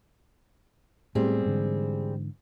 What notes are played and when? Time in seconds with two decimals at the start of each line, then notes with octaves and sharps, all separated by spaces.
1.15 A2 G3 G#3 B3 C4 G#4
1.46 G#2 D3 E3